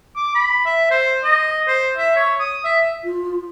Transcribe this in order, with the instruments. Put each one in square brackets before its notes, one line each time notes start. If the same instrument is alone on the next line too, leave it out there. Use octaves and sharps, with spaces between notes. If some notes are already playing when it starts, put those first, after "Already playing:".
[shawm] D6
B5
E5
C5
D#5
C5
E5
C#5
D#6
E5
[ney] F4